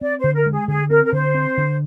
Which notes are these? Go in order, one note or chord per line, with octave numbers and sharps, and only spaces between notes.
C4 D5
C5
D3
A#4
G#3
G#4
D3 G#4
C4 A#4
A#4
D3 C5
C4
D3